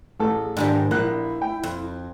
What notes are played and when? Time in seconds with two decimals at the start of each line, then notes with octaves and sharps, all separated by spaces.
0.20 A1 G#4 A4
0.57 G#2 D#3 G3 D4
0.91 A#1 A#3 E4 F#6
1.42 G5
1.64 F2